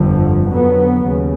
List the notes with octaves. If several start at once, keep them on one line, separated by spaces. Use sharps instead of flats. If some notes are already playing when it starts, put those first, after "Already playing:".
Already playing: G1 F2 D3 F3
F2 D3 F#3 B3
D#2 C#3